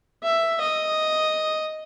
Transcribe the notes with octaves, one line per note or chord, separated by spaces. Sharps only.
E5
D#5